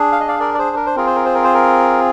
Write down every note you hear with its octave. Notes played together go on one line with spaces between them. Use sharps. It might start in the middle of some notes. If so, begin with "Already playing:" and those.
Already playing: D4 G#4
F5
D#5
D5 F5
A#4 D5
D5
G#4 C5
A#4
C5
C4 F4 G#4 A#4
C5
A#4
C5
A#4
C5
A#4